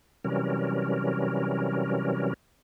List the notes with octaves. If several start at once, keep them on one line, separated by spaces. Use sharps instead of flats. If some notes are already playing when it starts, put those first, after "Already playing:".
C3 E3 F#3 G3 C#4 A#4